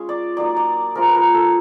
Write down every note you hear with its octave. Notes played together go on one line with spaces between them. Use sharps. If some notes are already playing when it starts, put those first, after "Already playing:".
Already playing: G#3 C#4 F4
D5
F#3 A#3 D#4 D5
D5
F3 G#3 C#4 F4 A#4
B4
A#4
A4